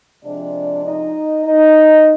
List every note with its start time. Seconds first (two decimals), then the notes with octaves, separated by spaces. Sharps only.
0.24 C3 F3 G#3 D4 D5
0.85 D#4 D#5
1.45 D#4 D#5